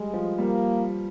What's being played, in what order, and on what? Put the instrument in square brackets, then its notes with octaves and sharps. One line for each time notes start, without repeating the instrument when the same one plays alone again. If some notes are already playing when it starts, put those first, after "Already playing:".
Already playing: [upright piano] G3 [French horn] G#3
[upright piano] F3
[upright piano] G3 [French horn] A#3